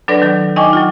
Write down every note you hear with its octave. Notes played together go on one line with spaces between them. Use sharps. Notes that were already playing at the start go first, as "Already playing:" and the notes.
F#3 D4 A4 B4 D5 A#6
D#3 F#3
D#4 D#5 G5 G#5 C#6 D6
F#3 F4